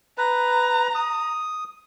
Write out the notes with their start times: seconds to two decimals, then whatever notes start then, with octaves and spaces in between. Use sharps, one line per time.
0.18 B4 A#5
0.95 D#6